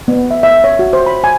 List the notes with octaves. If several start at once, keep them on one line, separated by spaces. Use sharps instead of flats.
B3
E5
E5
C#5
F#4
C5
B5
G#5